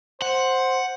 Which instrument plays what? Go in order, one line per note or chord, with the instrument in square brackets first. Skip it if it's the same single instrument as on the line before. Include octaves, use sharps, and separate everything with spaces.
[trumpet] C5 [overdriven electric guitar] F#5